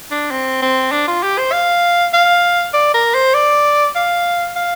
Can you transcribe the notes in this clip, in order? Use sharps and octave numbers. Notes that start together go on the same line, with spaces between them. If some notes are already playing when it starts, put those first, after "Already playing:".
D4
C4
C4
D4
F4
G4
C5
F5
F5
D5
A#4
C5
D5
F5
F5